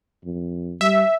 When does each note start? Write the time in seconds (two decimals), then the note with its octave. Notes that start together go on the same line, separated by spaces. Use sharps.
0.25 F2
0.81 G3 E5